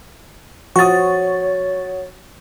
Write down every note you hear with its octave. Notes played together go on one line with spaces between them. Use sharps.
F3 F#4 C#5 C#6 D#6 A6